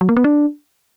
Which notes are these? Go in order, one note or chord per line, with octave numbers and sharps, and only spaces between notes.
F#3
A#3
B3
D4